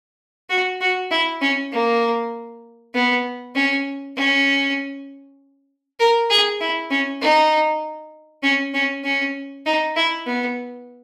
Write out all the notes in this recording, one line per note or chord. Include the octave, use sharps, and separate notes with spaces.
F#4
F#4
E4
C#4
A#3
B3
C#4
C#4
A#4
G#4
E4
C#4
D#4
C#4
C#4
C#4
D#4
E4
B3